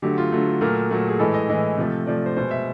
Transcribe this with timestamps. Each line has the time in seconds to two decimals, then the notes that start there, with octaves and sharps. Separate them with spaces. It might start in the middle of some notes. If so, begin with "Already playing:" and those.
0.02 D3 F#3 A3 G4
0.18 F4
0.32 D3 F#3 A3
0.61 A#2 F#3 A3 A#4
0.91 A#2 F#3 A3
1.08 G#4
1.19 A2 E3 G#3 A4
1.34 D#5
1.49 A2 E3 G#3 D#5
1.77 C3 F3 A3
2.07 C3 F3 A3 D5
2.26 C5
2.37 B2 G#3 C5
2.51 E5